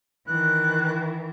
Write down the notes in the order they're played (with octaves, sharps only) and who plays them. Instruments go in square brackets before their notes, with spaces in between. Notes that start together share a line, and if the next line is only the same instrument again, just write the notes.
[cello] D#3 E3 [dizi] F#6